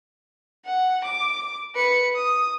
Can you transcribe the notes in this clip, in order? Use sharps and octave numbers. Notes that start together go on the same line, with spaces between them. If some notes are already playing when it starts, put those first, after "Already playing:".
F#5
D6
B4 C#7
D#6